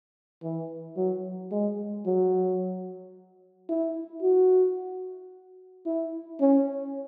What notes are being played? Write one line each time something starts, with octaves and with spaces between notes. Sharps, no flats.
E3
F#3
G#3
F#3
E4
F#4
E4
C#4